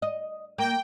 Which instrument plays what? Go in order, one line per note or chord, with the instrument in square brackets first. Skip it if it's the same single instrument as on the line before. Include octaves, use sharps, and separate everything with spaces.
[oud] D#5
[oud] A#3 [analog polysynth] G5